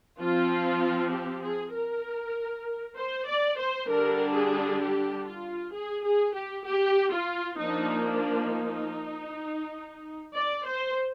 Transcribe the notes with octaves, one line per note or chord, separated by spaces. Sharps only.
F3 C4 F4
G4
G#4
A#4
C5
D5
C5
D3 G3 D4 A#4
G#4
G4
F4
G#4
G#4
G4
G4
F4
F3 A#3 D4 D#4
D4
D#4
D5
C5